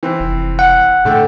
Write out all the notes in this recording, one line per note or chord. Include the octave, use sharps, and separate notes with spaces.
E3 C4
F1
F#5
A2 D3 A3 G5